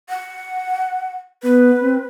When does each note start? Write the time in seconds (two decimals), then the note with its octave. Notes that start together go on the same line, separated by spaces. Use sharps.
0.09 F#5
1.43 B3 B4
1.81 C4